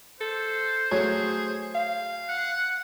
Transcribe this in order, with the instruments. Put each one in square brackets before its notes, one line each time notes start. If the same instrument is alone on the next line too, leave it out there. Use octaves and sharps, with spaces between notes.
[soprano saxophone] A4 [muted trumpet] C5
[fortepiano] F#3 A3 C#5 [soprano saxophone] G#4
[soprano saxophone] F5
[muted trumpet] F#5